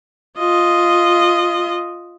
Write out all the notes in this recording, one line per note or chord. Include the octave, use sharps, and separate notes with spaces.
F4 D#5